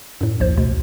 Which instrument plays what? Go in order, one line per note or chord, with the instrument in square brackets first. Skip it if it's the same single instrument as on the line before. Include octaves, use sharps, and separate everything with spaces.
[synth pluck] F#2 A2
A#1 D#2 C5
D2 B2